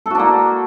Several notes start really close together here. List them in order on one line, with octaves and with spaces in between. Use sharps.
A4 F#4 D4 A#3